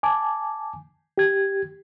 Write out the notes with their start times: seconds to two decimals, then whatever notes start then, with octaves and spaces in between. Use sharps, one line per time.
0.03 G#5 A5 D6
1.18 G4 G#6